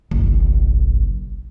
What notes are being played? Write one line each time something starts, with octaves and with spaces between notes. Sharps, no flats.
F#1 B1